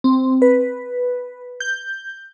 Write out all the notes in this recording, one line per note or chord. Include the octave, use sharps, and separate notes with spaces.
C4
B4
G6